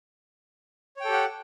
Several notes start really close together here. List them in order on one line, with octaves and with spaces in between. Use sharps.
C#5 G5 A4 G4 F#5